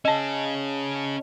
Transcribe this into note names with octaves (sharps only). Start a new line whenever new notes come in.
C#4 G#4 D#5 A5